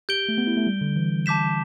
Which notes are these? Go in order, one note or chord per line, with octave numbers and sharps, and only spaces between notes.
G4 G6 D7 G7
A3
B3
E4
A3
G3
D3
E3
A5 D6 G6 B6 E7